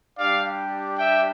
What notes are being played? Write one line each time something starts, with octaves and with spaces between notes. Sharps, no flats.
G3 D4 G4 D5 F5
E5 G5